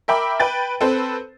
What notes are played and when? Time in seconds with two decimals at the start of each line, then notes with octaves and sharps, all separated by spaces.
0.08 A#4 E5 G5 B5 D6
0.40 B4 G5 A6
0.81 C4 A4 B4 C5